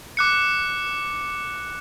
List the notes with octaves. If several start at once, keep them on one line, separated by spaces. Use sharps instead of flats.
D6 F#6 C#7